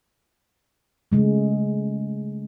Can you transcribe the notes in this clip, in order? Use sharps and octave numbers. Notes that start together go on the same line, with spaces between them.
C#3 G#3 A3